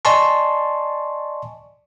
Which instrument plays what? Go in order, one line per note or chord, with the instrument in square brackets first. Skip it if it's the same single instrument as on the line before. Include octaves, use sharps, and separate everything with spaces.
[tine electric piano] D5 D#5 G#5 A5 C6 C#6